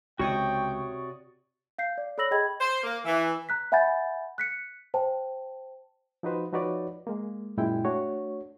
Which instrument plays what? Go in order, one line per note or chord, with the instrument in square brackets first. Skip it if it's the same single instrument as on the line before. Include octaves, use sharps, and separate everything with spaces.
[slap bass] C#2 [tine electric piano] C3 C#6 D#6 [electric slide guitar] F#4 C#5 D5 [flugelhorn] G5
[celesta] F5 G6 C7
D5
A4 C#5 B5 E6 A#6 F#7
G#4 D#5 G5 B5 G#6
[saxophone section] C5
A#3
E3
[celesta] A#5 F#6 B6
E5 F#5 G#5 B5 G6 A6
F#6 B6 C#7
C5 G5 A5
[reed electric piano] F3 D#4 F#4 B4 C5
F3 D#4 F#4 B4 C#5 D5
G#3 A#3
F#2 A#2 G#3 E4 G5
A3 D4 F#4 C#5